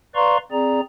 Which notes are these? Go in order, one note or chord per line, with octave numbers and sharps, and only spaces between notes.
B4 D5 F5 A#5 C6 C#6
C4 G#4 D5 A#5